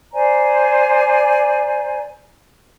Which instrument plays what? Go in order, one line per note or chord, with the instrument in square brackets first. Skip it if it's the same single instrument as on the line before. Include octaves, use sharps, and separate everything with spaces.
[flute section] C5 D5 G#5 A#5